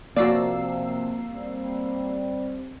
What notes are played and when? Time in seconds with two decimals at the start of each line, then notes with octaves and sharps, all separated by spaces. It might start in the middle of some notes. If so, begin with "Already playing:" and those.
0.17 C3 F3 A#3 F#4 D5 E6 C7
1.33 G3 C4